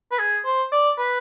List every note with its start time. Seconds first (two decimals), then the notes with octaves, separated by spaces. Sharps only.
0.12 B4
0.19 G#4
0.45 C5
0.72 D5
0.98 B4